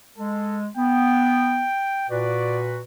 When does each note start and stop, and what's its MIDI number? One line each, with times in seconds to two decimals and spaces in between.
0.18 0.68 56
0.18 0.58 69
0.77 1.65 59
0.77 2.07 79
2.10 2.82 46
2.10 2.82 66
2.10 2.82 71
2.10 2.58 74